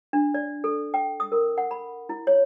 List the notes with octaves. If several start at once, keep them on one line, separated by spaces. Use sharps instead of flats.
D4
D5
A4
G5
D#6
A#4
F#5
B5
E4
C#5